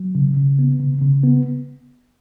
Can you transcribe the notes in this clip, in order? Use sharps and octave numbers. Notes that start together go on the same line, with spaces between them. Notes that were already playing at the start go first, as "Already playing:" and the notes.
Already playing: F#3
C#3
C#3
B3
C#3
C#3
B3